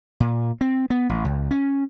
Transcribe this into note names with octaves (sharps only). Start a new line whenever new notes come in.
A#2
C4
B3
A1
C#2
C#4